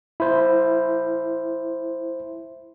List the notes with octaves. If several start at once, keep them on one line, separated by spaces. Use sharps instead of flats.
E4 C5